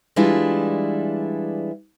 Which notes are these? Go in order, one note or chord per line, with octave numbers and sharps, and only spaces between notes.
E3 G3 G#3 D4 E4 F4